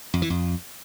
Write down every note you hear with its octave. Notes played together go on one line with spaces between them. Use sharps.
F2
E3
F2